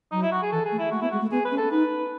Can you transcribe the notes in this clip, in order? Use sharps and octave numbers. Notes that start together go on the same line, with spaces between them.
F#3 D#4
E4
F#4
G#4
E3 A4
G#4
A3
E4
A3 F#4
B3 E4
G#3 F#4
A3
B3 G#4
B4
C#4
A4
D#4 B4